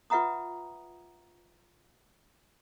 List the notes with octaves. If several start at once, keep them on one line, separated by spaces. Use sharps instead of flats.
F4 B4 E5 F#5 A#5 D#6